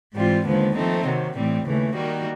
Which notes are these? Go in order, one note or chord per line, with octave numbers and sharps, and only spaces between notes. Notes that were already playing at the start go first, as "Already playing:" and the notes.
G#2 E3 G3 C4 F4
D#2 D3 F3 G#3 B3
F3 A3 C4 D#4
C3 D#3 F#3
A2 E3 G3 C4
D#2 C#3 E3 A3
D#3 G3 A#3 D#4 F#4